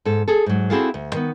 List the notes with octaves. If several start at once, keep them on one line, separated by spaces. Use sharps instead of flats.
G#2 A4
G#4 A4
G#2 F#3
C4 E4 F#4 G#4 A4 F5
D2
D#3 B3